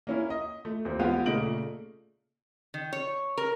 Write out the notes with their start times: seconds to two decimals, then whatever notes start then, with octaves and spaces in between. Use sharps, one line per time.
0.07 A#3 C#4 E4
0.30 D#5
0.65 A3
0.85 D#2 C4
0.99 A1 G#3 B3 F4 G4 G5
1.26 A#2 C#3 A3 D#5 D7 F#7
2.74 D#3
2.93 C#5
3.38 A#4